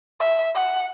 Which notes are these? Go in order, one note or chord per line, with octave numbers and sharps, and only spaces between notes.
E5
F#5